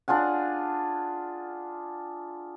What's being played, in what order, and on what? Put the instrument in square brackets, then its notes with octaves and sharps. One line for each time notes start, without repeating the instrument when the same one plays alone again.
[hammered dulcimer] D4 F4 G#4 F#5